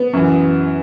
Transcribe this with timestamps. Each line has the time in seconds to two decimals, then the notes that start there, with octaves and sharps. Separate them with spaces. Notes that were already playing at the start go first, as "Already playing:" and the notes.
Already playing: B3
0.13 F#2 E3